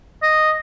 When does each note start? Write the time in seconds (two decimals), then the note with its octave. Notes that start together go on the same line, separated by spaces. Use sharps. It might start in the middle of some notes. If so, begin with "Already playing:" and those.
0.23 D#5